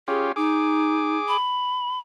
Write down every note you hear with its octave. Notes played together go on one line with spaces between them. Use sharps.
C#4 F4 G4 G#4
D#4 G#4 D6
B5